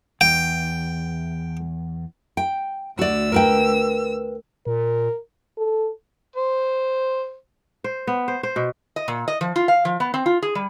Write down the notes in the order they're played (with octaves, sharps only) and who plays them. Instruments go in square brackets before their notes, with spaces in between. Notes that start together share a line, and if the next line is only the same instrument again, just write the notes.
[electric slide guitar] E2 [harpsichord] G5
[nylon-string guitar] G5
[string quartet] D2 E6 [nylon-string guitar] F#4 D5
[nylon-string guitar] A#4 B4 G5
[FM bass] A#2 [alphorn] A#4
[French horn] A4
[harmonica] C5
[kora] C5
B3
C5
C5
B2
[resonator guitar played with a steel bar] D#5
A#2
D#5
F3
F4
F5
F3
B3
C4
F4
G#4
G3